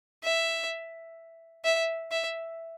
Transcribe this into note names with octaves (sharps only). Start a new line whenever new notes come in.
E5
E5
E5